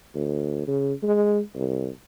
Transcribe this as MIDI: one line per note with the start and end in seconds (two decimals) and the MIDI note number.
0.14 0.65 38
0.67 0.93 49
1.03 1.40 56
1.55 1.88 36